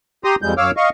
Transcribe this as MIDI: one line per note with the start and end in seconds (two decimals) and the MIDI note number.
0.24 0.36 67
0.24 0.36 82
0.24 0.36 84
0.24 0.36 87
0.42 0.54 41
0.42 0.54 55
0.42 0.54 56
0.42 0.54 91
0.57 0.71 42
0.57 0.71 73
0.57 0.71 77
0.57 0.71 86
0.57 0.71 88
0.57 0.71 89
0.77 0.90 75
0.77 0.90 77
0.77 0.90 85